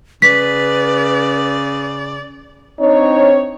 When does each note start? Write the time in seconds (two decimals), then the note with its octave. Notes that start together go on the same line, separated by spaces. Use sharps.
0.22 C#3 B4 D5 B6
2.80 C4 D4 D#4 C#5